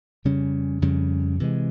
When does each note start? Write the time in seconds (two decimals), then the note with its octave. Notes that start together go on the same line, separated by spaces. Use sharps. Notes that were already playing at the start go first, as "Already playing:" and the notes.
0.25 F2 C#3 G3 C#4
0.82 F2 C#3 G3 C#4
1.40 C3 E3 G#3